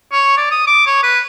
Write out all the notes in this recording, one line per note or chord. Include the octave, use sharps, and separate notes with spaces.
C#5
D5
D#6
D6
C#5
B4